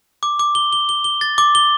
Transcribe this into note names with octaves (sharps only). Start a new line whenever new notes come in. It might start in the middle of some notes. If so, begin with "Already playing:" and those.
D6
D6
G7
G7
G7
G7
A6
D6
G7